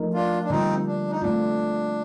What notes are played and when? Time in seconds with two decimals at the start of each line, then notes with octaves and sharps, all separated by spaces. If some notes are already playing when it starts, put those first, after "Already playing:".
Already playing: F3 A3 D#4 A#4
0.14 D4 F4
0.43 D4
0.49 D3 G3 A#3 C4 D#4 F4
0.86 D4
1.10 D#4
1.22 A3 C4 D4 F4